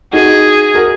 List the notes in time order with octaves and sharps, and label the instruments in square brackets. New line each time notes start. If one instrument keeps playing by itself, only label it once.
[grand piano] D#4 F#4 [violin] G#4
[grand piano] F#4 A#4